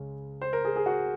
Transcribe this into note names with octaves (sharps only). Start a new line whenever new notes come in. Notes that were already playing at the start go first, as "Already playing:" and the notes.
Already playing: C#2 C#3 G#3 C#4
C5
A#4
G#4
G#4
F#4